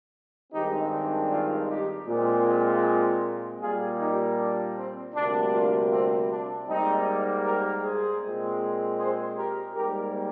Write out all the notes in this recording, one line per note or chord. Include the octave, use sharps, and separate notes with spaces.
G2 D#3 G#3 C4 D#4 G4
D4
D4 F4
D#4 G4
A#2 G#3 C4
A#2 G3 A#3 F4 G#4
D#4 G4
D4
C4
D2 C3 G3 A#3 D4
D4 F4
C4
D4
G#2 G3 A#3 C4 D#4
G4 A#4
G#4 C5
A#2 G#3 C4
G#4 C5
G4 A#4
G#2 G3 A#3 G4 A#4